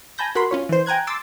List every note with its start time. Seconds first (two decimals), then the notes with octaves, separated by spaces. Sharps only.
0.18 G#5 A5 B5 G6 A#6
0.35 F#4 A#4 B5 C6
0.51 C#4 F4 C#5
0.69 E3 C5
0.86 G5 G#5 A#5 F#6 G#6
1.07 C6 D6 E6 A6